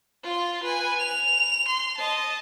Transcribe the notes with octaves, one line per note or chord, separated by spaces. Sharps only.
F4 C6
B4 G#5
F7
C6
D#5 A5